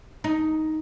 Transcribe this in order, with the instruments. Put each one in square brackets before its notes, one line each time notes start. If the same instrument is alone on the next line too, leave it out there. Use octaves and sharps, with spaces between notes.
[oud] D#4